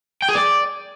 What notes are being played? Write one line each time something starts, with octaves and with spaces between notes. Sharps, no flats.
G5
G#4
D5